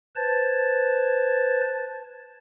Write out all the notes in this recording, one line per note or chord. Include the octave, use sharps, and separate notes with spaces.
B4 C5 A5 G#6 A6